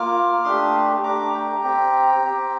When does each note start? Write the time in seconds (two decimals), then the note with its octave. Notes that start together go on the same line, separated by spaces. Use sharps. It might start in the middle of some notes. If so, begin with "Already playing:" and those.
Already playing: A#3 F4 D6 F6
0.44 A3 D4 G4 C6 D#6
1.03 A3 D4 G4 A#5 D6
1.34 G5 A#5
1.64 C4 G4
2.22 C4 G4